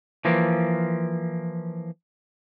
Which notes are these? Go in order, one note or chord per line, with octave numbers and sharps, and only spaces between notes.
E3 F3 A#3